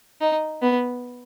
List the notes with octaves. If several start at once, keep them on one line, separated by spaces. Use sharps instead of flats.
D#4
B3